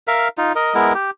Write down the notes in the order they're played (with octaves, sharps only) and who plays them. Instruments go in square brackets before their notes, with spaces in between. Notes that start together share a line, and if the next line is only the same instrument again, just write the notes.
[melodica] A#4 E5 F5
D#4 F4
A#4 D#5
G#3 B3 E4 A#4
G4